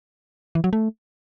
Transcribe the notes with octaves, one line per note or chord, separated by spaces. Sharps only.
E3
F#3
A3